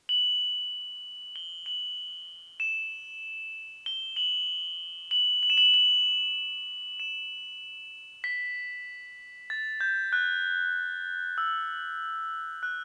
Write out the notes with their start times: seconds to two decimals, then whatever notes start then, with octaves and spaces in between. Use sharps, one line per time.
0.09 F#7
1.36 G7
1.66 F#7
2.60 E7
3.86 G7
4.16 F#7
5.11 F#7
5.43 F#7
5.50 E7
5.58 F#7
5.74 F#7
7.00 E7
8.24 B6
9.50 A6
9.81 G6
10.13 F#6
11.38 E6
12.63 F#6